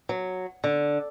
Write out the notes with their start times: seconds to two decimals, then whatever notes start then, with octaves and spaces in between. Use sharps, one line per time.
0.09 F#3
0.64 D3